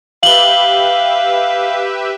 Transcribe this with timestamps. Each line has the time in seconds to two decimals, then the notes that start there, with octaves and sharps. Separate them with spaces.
0.23 G4 B4 E5 F5 F#7 G7